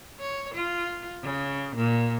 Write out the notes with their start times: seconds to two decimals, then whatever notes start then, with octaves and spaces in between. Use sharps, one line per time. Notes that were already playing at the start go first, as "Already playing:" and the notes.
0.19 C#5
0.54 F4
1.23 C#3
1.75 A#2